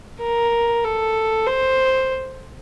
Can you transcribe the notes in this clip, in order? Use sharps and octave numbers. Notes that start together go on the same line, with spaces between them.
A#4
A4
C5